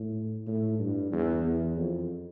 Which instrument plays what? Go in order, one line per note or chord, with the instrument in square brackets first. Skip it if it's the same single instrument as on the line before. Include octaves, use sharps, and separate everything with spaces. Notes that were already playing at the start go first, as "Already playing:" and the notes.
Already playing: [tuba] A2
A2
G2
E2
E2
F2